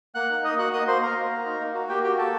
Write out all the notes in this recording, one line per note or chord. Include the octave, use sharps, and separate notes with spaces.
A#3 F#5 F#6
D#4
A#3 D#5 D#6
F#4 F#5 F#6
A#3 D#5 D#6
A#3 C5 C6
A#3 A#4 A#5
F#4
A#3
D#4
A#3
F#4
A#3 G4 G5
F#4 G4 G5
F#4 A4 A5